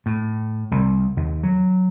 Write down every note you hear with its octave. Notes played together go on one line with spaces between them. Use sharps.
A2
C2
D#2
F#3